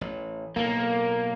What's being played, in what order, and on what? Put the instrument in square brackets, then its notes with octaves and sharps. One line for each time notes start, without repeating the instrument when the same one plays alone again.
[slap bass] A1
[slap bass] B1 A2 [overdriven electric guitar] A#3